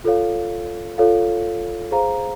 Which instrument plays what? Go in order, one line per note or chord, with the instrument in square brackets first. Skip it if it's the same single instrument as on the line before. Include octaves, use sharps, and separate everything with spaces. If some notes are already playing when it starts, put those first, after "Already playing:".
[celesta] F4 A4 C#5 F5
F4 A4 C#5 F5
G#4 C5 F5 A#5